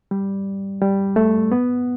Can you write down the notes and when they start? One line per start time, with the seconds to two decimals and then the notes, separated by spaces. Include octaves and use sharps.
0.11 G3
0.82 G3
1.16 A3
1.52 B3